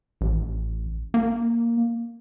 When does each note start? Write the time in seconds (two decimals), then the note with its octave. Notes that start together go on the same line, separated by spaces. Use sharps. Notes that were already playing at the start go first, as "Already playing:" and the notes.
0.21 A1
1.14 A#3